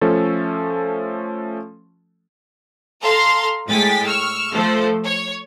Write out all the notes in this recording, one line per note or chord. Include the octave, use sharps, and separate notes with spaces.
F3 A3 C#4 A4
A4 F5 A#5 C6
A2 G#3 G5 G#5 A6 B6
C#6 E6 F6
F3 A3 A4 C5
C#5